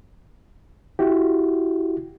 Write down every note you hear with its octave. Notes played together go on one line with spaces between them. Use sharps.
E4 F#4 G4